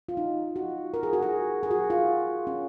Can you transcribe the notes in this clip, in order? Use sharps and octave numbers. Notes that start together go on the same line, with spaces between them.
F4
D#4
F#4
A#4
G#4
F#4
G#4
G#4
F#4
F4
C#4